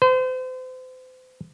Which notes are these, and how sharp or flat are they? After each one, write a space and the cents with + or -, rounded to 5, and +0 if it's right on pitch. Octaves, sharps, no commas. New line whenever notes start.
C5 -35